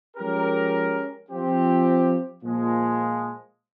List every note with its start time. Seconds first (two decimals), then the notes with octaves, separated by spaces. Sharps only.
0.17 F3 G#3 C#4 G4 A#4
1.30 F3 C4 G4
2.43 A#2 F3 G#3